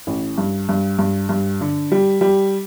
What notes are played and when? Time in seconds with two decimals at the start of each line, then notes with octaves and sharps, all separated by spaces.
0.07 A1
0.38 G2
0.69 G2
0.99 G2
1.29 G2
1.61 D3
1.92 G3
2.21 G3